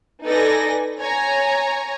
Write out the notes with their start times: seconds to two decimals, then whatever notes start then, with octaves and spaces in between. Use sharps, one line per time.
0.24 D#4 A4 B4 D5 G#5 A#6
1.00 C#5 G#5 A#5